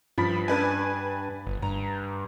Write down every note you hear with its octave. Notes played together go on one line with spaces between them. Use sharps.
G2 F3 B5 B6
D4 B4 G#5
G1
G2 A#5